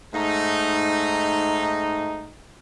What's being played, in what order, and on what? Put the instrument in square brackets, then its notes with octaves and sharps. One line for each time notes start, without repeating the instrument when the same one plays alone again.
[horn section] G#2 A3 D#4